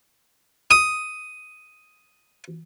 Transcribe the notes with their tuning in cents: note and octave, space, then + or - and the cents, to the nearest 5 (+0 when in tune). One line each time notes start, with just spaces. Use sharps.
D#6 +5